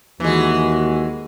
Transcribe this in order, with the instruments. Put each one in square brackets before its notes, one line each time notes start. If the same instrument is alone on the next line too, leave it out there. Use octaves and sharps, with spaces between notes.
[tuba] D#2 [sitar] E3 G#3 [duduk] F#4